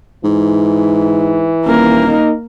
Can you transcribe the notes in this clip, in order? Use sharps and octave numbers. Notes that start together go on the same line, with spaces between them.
G#2 E3
D#1 A#3 A#4
D#4